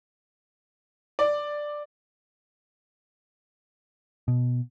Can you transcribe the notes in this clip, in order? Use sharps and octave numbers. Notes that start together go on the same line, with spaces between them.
D5
B2